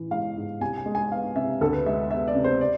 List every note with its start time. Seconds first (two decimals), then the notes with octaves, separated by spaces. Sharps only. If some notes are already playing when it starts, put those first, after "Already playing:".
Already playing: A1 E3
0.11 G#3 F5
0.37 G#2
0.61 C2 G#5
0.78 G#5
0.86 G#3
0.95 G#5
1.11 B3 F5
1.36 C3 E5
1.61 D2 A4
1.73 B4
1.86 G#3 E5
2.11 B3 E5
2.28 D5
2.35 C3
2.44 C5
2.61 D5